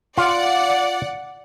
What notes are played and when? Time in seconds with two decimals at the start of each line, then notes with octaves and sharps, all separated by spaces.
0.18 F4 D5 F#5